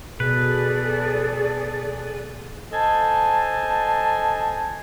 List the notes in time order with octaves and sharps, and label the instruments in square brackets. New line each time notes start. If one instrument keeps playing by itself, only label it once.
[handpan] B2 [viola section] G#4 [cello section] A4 D5 [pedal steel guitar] B4
[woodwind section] A4 C5 D#5 G#5 A5